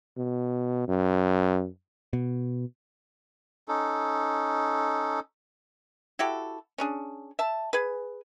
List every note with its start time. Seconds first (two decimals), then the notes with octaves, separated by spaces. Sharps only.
0.18 B2
0.88 F#2
2.13 B2
3.68 C#4 D#4 A4
6.19 E4 F#4 G4 A4
6.78 C#4 D4 G#4
7.39 E5 A5
7.73 G#4 B4